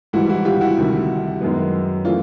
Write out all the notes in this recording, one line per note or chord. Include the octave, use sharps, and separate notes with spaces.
G#2 E3 G3 E4 F#4
E4 F#4
F4 G4
E4 F#4
D2 C3 D#3 G3
F#2 D#3 G#3 B3
E3 A3 C#4 F4